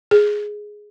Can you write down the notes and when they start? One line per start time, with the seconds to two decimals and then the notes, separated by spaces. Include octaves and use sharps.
0.11 G#4